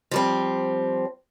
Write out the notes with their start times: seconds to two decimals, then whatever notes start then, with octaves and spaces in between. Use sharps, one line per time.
0.11 F3 G3 C4